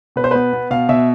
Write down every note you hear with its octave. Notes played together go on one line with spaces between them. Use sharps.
B2 B4
C5
B3 B4
B3
B2 F5
B2 E5